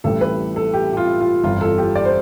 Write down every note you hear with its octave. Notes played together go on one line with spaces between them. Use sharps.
A1 A2 E3 G3 A4
B4
A4
G4
G4
F4
F4
G1 F2 E3 G3 F4
A4
G4
D5
C5